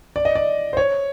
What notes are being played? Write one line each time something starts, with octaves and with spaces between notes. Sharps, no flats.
D5
D#5
D5
C5
C#5